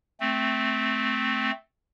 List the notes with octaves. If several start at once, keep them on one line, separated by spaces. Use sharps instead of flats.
A3 C4